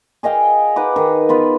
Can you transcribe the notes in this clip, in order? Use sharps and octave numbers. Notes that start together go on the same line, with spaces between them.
G#4 D#5 F5 G5
D#4 B4 F#5 D6
D#3
B3 F4 B4